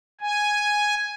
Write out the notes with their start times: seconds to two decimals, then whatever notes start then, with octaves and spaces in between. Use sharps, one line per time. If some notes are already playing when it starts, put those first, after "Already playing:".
0.21 G#5